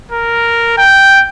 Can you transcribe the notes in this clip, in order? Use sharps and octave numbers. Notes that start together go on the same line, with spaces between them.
A#4
G5